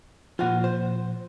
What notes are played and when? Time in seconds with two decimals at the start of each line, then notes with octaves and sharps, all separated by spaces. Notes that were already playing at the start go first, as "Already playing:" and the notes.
0.39 A#2 F3 F4 F#5
0.64 C5